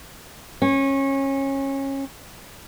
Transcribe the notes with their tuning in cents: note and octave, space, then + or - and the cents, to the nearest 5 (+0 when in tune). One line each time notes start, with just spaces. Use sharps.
C#4 -25